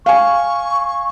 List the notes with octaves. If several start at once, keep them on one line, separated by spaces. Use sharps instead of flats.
F5 G#5 C#6